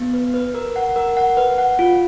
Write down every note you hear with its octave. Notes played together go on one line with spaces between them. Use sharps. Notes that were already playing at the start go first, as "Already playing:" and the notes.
Already playing: B3
B4
B4
A#4
F#5
A#4
F#5
B4
F#5
F4